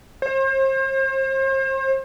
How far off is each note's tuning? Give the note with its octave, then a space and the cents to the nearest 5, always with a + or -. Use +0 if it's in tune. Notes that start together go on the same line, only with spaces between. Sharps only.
C5 +40